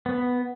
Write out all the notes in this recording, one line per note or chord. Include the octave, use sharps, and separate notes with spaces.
B3